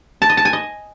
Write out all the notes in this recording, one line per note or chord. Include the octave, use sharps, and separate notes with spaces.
A5
D#5
A5
G#5
D#5